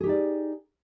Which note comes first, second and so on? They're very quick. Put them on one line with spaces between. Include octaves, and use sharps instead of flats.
G#4 G4 D#4 D5